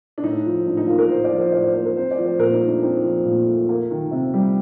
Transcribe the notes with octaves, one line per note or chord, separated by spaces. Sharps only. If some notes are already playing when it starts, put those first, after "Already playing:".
D4
A2 D#4
F3
A2 D4
D#4
A#3 F4
A#4
A2 C5
D5
F3
C5
A2 D5
C5
A#3 C5
A#4
C4 C5
D5
F3
C5
A#2 A#4
D#4
A3
D4
C4 D#4
F3
A#2
A3
A#3
D#3
C3
G3